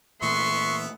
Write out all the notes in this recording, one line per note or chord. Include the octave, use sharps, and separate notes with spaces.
A#2 E3 A3 B3 E5 C6 C#6